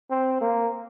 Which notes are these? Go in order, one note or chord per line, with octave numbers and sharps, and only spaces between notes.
C4
A#3